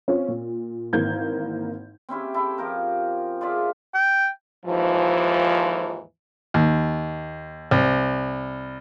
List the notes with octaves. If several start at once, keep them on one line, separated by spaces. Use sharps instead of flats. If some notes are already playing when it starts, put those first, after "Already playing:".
C4 C#4 F4
A#2
G#1 E3 A#3 G6 G#6
C4 C#4 E4 G4
E4 A4
F3 G4 A#4
F4 G#4 D5 E5
G5
D#2 G#2 E3 F3
D#2
C2